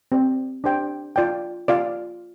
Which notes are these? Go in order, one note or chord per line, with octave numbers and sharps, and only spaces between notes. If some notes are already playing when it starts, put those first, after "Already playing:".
C4 G4 D5 G5
D4 G4 C5 G5
F4 D5 G5
F4 D5 F5